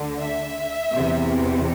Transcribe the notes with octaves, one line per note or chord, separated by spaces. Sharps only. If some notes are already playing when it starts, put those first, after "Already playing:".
Already playing: D2 D3
E5
E2 C3 E3